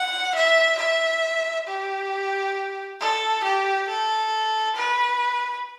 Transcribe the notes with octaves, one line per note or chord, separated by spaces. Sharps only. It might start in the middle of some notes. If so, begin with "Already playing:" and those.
Already playing: F#5
E5
E5
G4
A4
G4
A4
B4